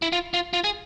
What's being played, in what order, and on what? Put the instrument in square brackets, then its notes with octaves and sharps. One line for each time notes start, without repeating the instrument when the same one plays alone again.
[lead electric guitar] E4
F4
F4
F4
G#4